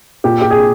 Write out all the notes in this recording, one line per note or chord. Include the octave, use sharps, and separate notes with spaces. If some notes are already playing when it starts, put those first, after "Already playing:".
A#2 G4
G4
G#4